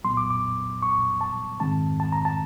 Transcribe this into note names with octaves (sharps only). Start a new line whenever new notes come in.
C2 A#2 F#3 B3 C6
D6
D6
C#6
A5
G#2 D#3 G#3 C4 A5
A5
A#5
A5